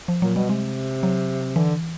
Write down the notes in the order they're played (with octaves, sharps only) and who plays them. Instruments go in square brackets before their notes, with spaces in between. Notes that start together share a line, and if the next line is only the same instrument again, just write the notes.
[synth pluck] F3
[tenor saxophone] A#2 [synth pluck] F#3
[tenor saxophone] B2 [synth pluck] G3
[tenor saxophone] C3 [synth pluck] G#3
[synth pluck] F#3
[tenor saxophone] D3 [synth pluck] E3